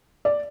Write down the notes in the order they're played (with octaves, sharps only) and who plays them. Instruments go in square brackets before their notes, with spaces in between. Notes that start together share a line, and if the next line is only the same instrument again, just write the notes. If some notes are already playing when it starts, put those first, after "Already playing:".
[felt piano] D5